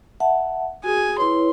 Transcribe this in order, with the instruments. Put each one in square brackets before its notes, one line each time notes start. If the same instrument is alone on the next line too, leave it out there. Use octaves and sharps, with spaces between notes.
[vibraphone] E5 F#5 A5
[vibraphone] F#4 [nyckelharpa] G#4 G#5
[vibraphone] E4 B4 C#5 [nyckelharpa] C6